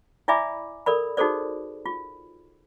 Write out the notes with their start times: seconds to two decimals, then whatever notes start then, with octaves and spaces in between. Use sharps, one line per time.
0.28 E4 D5 E5 G#5 B5 D6
0.86 A4 A#4 D5 B5
1.17 D#4 F#4 G#4 A4 C5 D5
1.86 F4